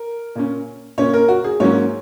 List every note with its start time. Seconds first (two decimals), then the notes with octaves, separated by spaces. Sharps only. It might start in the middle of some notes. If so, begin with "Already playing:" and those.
Already playing: A#4
0.35 A#2 A#3 C#4
0.98 A#2 A#3 C#4 C#5
1.13 A#4
1.28 F#4
1.44 G#4
1.60 G#2 F#3 A#3 C#4 C#5